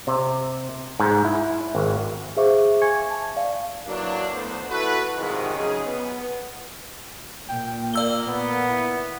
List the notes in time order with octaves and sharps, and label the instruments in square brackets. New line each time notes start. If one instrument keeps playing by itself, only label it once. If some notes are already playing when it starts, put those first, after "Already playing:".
[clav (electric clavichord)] C3
G#2
E4
G#1
[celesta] G#4 C5 E5 F5 C#6 D6
G#5 C#6 G#6 C#7
A5
D5 F5
[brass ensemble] E3 F#3 A#3 D4
D2 B3 C5
E4 F#4 A4 B4
G#2 C3 D#3 F3 G3 G#3
C#3 F#3 D#4 G#4
B3
[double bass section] A#2 [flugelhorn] G5
[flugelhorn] A#3 [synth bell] D5 E6 G7
[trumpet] B3
[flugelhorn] E4